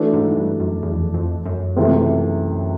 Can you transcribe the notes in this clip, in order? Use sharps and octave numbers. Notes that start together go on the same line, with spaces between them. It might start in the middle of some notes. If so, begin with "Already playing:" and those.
Already playing: E3 A3 D4 F#4 B4
G#2
G2
F#2
E2
F2
E2
F2
F#2
C#2 C3 E3 A3